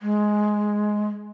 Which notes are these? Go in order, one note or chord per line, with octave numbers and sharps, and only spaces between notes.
G#3